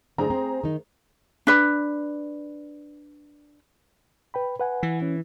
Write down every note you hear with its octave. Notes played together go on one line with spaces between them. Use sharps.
D3 A3 D4 G#4 C5 A#5
C4
D#3 D#4
D4 B4
B4 G5 B5
B4 F#5 G#5
E3
C#4